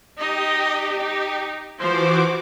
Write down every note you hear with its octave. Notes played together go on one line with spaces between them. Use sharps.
D#4 G4 D#5
D#4
E3 F3 F#4 C5 D6